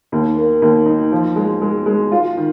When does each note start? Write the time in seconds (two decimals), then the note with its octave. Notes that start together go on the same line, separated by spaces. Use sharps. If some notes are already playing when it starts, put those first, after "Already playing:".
0.12 D#2
0.37 A#3
0.62 D#2
0.86 D#4
1.12 F3
1.36 G#3
1.62 G#3
1.86 G#3
2.12 F4
2.36 D#3